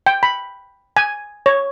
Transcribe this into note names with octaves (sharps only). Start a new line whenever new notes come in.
G5
B5
G#5
C#5